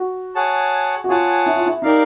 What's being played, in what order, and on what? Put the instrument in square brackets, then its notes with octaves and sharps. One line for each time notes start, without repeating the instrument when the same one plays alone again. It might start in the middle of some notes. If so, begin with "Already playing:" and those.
Already playing: [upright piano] F#4
[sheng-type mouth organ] G#4 C#5 F#5 A5
[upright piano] F#4
[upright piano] F4 [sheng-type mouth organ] G#4 C#5 F#5 A5
[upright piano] E4
F4
E4
[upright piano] D#4 [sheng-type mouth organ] G4 A#4 D5 F5